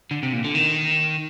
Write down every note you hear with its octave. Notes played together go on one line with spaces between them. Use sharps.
D3
C3
A#2
D3
D#3